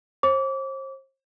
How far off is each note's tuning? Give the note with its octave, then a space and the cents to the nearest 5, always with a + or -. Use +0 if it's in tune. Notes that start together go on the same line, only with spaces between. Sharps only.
C5 +40 D6 -30